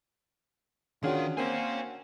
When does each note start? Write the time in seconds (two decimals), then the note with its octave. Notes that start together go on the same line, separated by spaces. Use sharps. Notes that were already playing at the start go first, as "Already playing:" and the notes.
1.03 D#3 C#4 D4 F4 F#4 G#4 A#4
1.37 A#3 C4 C#5 G#5